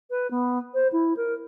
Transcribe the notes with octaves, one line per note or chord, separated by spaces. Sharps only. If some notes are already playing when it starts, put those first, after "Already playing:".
B4
B3
C5
E4
A#4